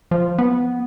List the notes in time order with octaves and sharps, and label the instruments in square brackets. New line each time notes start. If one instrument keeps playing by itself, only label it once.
[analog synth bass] F3
B3